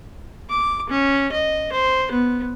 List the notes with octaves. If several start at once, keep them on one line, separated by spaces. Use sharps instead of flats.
D6
C#4
D#5
C5
B3